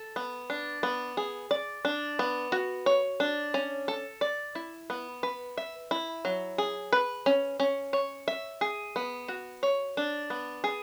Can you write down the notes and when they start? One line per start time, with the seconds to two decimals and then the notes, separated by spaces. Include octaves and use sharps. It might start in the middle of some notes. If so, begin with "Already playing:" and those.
Already playing: A4
0.16 B3
0.50 D4
0.83 B3
1.17 G#4
1.51 D5
1.85 D4
2.19 B3
2.52 F#4
2.86 C#5
3.20 D4
3.54 C#4
3.88 A4
4.21 D5
4.55 E4
4.90 B3
5.23 B4
5.58 E5
5.91 E4
6.25 F#3
6.58 G#4
6.93 B4
7.26 C#4
7.60 C#4
7.93 C#5
8.28 E5
8.61 G#4
8.96 B3
9.28 F#4
9.63 C#5
9.97 D4
10.30 B3
10.64 G#4